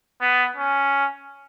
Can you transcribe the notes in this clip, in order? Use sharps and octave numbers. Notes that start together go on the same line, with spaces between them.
B3
C#4